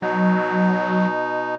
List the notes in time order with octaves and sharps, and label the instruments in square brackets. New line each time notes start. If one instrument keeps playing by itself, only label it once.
[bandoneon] B2 D#4 [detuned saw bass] F#3